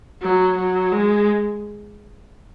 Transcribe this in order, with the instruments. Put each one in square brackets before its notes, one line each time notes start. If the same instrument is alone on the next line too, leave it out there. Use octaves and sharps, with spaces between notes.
[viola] F#3
F#3
G#3